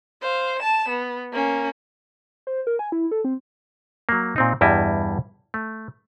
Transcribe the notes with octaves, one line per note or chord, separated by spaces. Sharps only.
C5 F5
A5 E7
B3
A#3 C#4
C5
A#4
G#5
E4
A4
C4
F#3 A#3
A#2 C4 D#4
E2 G2 G3 E4 D#5
A3